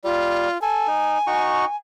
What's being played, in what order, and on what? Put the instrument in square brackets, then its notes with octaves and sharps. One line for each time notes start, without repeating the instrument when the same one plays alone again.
[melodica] G3 [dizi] F4
[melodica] A4 [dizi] G#5
[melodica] D#4
D#4 F#4 C#6